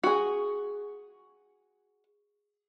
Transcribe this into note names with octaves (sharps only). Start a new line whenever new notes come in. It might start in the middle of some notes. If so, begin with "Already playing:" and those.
F#4 G#4